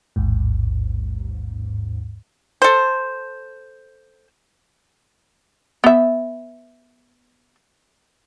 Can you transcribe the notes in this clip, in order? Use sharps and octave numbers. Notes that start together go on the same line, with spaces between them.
A1 D#2 G#2
A4 C5
B3 E5